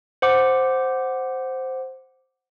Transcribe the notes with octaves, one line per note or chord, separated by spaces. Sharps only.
C5 F#5 D6